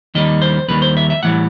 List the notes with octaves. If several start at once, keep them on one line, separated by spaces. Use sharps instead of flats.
D#2 D#3 G3 D#5
C5
D#2 D#3 G3 B4
C5
E5
E5
A2 E3 G3 F#5